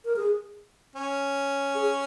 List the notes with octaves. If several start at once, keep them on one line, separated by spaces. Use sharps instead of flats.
A#4
G#4
C#4
G#4